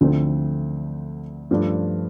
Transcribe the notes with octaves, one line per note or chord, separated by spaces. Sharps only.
D2 D3 F3 A3 C4
G2 F3 A3 D4